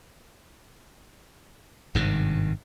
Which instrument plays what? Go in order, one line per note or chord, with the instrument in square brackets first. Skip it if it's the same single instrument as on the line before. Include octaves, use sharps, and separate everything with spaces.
[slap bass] G#1 G2 C3 D#3